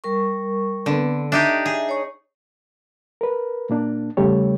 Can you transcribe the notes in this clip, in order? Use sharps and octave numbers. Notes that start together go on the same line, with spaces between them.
G3 A#4 C#6
D3 B3 C4 B4
D4 D#4 G4 E5
G#4
C#5 C#6
A#4 B4
A#2 A#3 D4
E2 C#3 G3 A3 G4 C#5